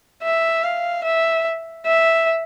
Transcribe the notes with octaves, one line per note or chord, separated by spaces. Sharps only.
E5
F5
E5
E5